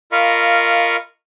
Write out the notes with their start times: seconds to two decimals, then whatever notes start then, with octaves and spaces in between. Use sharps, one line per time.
0.12 F4 A#4 D#5 F5 B5 C#6